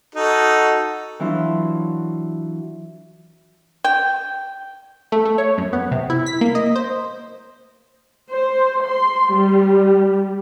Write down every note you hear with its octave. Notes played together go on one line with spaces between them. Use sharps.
D#4 F#4 A4
E3 F#3 D4 E4 F4
G5
A3
A3
C#5
F#2
B3
C3
E4
B6
A#3
D#5
C5
C5
C6
G3